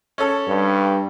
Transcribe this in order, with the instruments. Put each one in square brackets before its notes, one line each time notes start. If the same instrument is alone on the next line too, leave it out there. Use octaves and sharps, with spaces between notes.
[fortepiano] C#4 A4
[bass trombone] G2